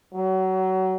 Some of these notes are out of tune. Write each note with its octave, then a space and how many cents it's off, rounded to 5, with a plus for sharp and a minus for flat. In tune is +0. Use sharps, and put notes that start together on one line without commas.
F#3 +25